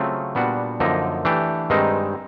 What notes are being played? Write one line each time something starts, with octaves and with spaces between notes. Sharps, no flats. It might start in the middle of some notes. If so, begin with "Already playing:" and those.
Already playing: C#3 F#3 A3 C4 F4
A#2 G3 B3 D4 F#4
F#2 D3 F3 A#3 D#4
E3 A3 D4 G4
G2 D#3 G#3 C4 D#4